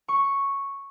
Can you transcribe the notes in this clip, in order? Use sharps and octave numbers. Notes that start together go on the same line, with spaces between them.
C#6